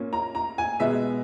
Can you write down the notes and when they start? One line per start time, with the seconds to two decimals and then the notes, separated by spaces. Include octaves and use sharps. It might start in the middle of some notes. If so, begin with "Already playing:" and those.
Already playing: A#2 A#3 C#4
0.13 A#5
0.35 A#5
0.58 G#5
0.80 B2 G#3 B3 E5